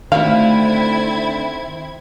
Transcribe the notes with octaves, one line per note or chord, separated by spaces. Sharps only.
D3 D#3 A3 C4 E4 F#4 F5 G#6